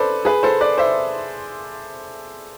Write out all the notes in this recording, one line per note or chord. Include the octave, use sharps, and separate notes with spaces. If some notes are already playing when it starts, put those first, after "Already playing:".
Already playing: A4 B4 C5 D5
G#4 B4
A4 C5
B4 D5
C5 E5